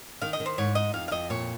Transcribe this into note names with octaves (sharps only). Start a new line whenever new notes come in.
D#3 F5
D#5
D#3
C5
G#2 C#5
D#4 D#5
F2 F5
F5
F2 D#5
A#2 C#5